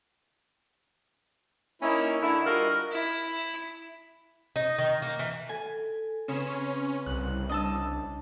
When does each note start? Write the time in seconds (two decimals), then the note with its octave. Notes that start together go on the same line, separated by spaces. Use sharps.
1.82 A#3 C#4 D#4 E4
2.21 D3 E4
2.46 G3 F4 F#4 A#4 D#5 F#5
2.92 E4
4.56 D#4
4.78 D#3
5.02 A#3
5.19 E3
5.49 A4 G#5
6.28 C#3 C4 C#4 B4
7.06 C2 F#6
7.49 D4 D#5 A5 E6